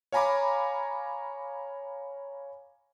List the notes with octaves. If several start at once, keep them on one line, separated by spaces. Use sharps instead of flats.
C#5 F5 G#5 A#5 B5 D6